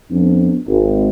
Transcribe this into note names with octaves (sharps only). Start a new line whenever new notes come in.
F2 B3 D4
G#1